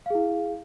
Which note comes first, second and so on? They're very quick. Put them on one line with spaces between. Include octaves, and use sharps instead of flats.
F5 G#4 E4